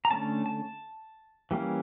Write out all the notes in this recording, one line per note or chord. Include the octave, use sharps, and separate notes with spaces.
A#5
D3 A3 C#4 A5
A5
E3 G3 A#3 C#4